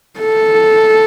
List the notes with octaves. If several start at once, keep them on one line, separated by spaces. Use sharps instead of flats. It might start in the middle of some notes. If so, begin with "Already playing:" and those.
A4